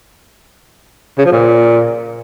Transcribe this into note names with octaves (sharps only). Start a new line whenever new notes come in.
C#3
F3
A#2